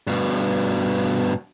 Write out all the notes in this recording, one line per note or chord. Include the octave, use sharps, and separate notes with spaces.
G2 B2